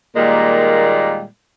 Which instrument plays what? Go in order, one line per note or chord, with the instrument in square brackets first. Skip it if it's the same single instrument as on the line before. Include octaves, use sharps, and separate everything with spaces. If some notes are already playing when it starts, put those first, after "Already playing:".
[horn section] A#2 D#3 G3 G#3 A#3